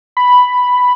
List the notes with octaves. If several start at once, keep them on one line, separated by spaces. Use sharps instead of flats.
B5